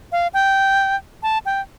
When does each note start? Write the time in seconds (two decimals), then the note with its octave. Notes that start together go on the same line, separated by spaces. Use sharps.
0.12 F5
0.34 G5
1.23 A5
1.46 G5